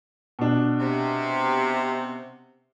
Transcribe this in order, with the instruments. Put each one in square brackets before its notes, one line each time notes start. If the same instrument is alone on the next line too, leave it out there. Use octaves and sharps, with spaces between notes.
[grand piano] B2 D4
[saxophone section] C3